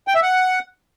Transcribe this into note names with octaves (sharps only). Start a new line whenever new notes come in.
G5
E5
F#5